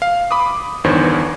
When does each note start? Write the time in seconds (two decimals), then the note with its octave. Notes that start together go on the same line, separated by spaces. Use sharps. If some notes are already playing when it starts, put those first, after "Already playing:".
0.02 F5
0.31 B5 D6 D#6
0.84 G1 E2 G2 D#3 C5 C#5